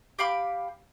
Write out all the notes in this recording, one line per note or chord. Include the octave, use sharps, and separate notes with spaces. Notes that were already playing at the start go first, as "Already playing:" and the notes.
G4 F5 B5 D6